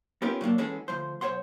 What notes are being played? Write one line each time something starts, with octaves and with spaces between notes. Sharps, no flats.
B3 C#4 D#4 F4 G4 A#4
F#3 G3 A#3 D4
E3 G#3 C#4 F#4 G#4 A4
D2 F3 C5
B1 C5 C#5 F#5 C6